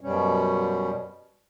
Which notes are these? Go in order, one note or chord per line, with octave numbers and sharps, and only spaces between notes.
F#2 B2 G3 C#4